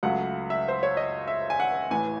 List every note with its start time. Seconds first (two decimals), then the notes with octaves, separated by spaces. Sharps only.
0.03 C#2 C#3 F#3 A3 F#5
0.50 E5
0.68 C5
0.83 C#5
0.97 D#5
1.28 E5
1.50 G#5
1.60 F#5
1.90 A1 A2 E3 G#5